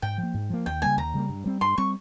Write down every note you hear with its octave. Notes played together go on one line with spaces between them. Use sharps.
G#2 G5
F3
A#3
G#2
F3 A#3
D#2 G5
C#3 G3 A#3 G#5
D#2 A#5
C#3 G3 A#3
G2
G3 C4
G2 C6
G3 C4 C#6